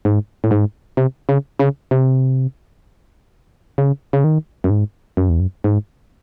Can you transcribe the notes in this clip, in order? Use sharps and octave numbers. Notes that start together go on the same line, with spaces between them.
G#2
A2
G#2
C3
C#3
C#3
C3
C#3
C#3
D#3
F#2
G#2
F#2
E2
F#2
G#2